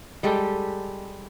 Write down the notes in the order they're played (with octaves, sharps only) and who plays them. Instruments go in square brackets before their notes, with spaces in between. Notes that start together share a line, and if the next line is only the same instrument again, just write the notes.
[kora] G3 G#3 G4 A4